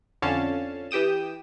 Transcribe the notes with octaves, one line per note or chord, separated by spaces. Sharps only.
F2 D3 C#4 F5 A5
E3 G4 G5 D#6 E7